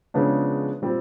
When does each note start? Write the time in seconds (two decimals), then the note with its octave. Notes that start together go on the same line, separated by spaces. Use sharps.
0.14 C#3 F3 G#3 B3 D4
0.82 A#2 G3 C4